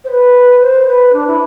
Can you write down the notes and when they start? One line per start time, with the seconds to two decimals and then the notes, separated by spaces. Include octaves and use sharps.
0.04 C5
0.10 B4
0.61 C5
0.87 B4
1.12 D4
1.26 E4